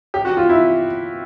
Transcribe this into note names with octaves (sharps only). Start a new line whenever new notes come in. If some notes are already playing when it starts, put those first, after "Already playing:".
G4
F#4
F4
E4